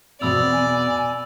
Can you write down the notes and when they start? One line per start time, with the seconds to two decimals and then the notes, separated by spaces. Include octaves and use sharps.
0.21 E2 B2 B3 C4 D5 B5 E6 F7
0.52 G#5